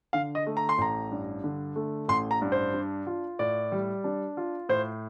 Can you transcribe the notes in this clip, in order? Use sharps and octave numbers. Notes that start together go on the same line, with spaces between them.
D3 F5
D#5
A3
A#5
C6
A1 A#5
G2
D3
A3
A1 C6
A#5
G2
C5
D4
F4
A2 D5
G3
D4
F4
A2 C5